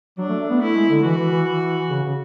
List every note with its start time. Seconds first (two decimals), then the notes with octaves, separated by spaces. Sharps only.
0.18 F#3 D4
0.29 A3
0.40 A3
0.50 B3
0.61 A3 E4
0.75 G#3
0.90 D3
1.04 E3 F#4
1.18 E3
1.32 E3
1.47 E3
1.90 C#3
2.04 C#3